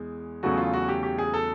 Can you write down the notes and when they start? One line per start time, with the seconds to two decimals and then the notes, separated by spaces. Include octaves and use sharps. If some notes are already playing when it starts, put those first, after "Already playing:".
Already playing: E2 G#3
0.43 E2 C#3 F#3 A3 F#4
0.57 F4
0.73 F#4
0.88 G4
1.03 G4
1.18 G#4
1.34 A4